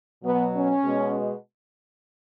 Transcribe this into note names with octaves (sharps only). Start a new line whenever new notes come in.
B2 F#3 B3
C#4
B2 G#3